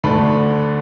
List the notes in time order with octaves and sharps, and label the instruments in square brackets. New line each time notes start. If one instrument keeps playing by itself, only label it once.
[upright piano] D2 D3 A3 D4 B5